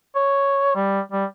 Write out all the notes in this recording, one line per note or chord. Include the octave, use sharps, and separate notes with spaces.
C#5
G3
G3